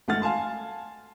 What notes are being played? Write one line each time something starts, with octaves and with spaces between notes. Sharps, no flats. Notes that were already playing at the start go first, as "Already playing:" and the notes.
G#1 A3 F#5 F6 A6
F5 G#5 A5 C6